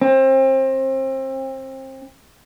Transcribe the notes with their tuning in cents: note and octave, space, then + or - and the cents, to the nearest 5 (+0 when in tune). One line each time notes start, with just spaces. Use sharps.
C4 +30